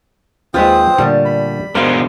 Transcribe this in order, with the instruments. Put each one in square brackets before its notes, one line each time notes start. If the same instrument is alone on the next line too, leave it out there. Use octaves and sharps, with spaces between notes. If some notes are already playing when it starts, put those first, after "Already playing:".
[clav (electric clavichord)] D#2 G#3 [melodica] C4 C5 D#6 [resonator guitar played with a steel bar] F4 B4
[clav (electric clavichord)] A#2 D3 A3 [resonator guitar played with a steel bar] G3
[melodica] B5
[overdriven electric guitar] B2 D3 [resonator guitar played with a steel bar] G#3 F5 [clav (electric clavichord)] A#4 C5